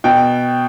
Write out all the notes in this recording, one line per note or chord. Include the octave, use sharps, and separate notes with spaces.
B2 G5